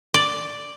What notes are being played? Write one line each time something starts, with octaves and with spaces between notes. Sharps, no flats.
D5